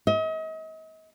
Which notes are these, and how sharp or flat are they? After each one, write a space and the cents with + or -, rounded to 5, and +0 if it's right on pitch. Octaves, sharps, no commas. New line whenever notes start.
D#5 +40